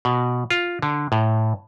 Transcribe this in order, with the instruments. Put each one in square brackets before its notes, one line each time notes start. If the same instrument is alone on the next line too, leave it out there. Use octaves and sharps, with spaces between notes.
[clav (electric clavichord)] B2
F4
D3
A2